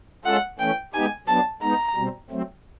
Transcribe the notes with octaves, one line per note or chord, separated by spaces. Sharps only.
G#3 C#4 F4 A4 F#5
E3 A3 C#4 G5
G#3 B3 D#4 G4 G#5
F#3 B3 D4 A5
G#3 B3 D#4 A#5
B2 G3 C4
F#3 A3 C4